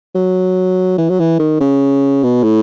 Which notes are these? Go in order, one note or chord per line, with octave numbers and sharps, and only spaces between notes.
F#3
E3
F#3
E3
D#3
C#3
B2
A2